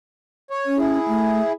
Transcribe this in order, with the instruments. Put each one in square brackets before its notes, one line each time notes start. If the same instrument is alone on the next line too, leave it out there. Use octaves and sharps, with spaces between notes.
[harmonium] C#5
[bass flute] C#4
[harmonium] E4 G#4
[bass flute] A3